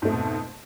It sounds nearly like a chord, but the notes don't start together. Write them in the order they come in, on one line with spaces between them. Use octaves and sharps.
G#2 A3 F2 B2